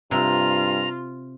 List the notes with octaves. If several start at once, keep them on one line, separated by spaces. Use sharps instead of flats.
G2 C3 C4 F4 A#5